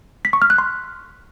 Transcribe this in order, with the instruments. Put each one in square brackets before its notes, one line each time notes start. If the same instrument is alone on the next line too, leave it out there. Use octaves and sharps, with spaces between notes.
[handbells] B6
C#6
F6
F#6
C6